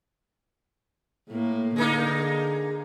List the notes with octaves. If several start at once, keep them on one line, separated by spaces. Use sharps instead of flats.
A2 A#3
D3 G#3 A#3 D#4